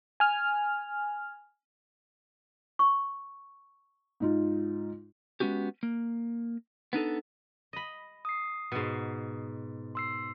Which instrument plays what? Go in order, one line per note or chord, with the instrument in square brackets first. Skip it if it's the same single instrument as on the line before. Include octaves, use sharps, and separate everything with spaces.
[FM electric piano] G#5 F6
[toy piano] C#6
[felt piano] G#2 D#4 F4
[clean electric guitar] G#3 B3 C#4 F#4 G4
A#3
B3 D4 D#4 A4
[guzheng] D#5 B5
[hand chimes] D#6 C7
[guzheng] G#2 B2
[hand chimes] C6 E6 C7